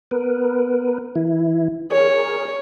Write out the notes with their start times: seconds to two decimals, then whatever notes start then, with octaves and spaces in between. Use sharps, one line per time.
0.11 B3 A#4 B4
1.15 E3 E4
1.92 G#4 A#4 C#5